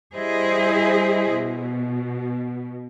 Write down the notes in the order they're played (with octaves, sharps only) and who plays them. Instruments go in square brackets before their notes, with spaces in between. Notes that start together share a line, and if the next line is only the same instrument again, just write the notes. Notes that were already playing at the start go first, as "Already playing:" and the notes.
[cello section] G3 E4 G#4 C5 D#5
B2